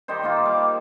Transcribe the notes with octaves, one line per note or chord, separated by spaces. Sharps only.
D#3 G3 D#4 C5
A#3 D#4 F4
G3 A#4 D6